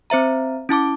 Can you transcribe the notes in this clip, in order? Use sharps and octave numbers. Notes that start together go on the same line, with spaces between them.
C4 C5 E5 A#5
C#4 E4 A5 D6